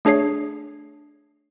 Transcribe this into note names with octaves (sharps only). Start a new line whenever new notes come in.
A3 D4 G#4 C#5 C7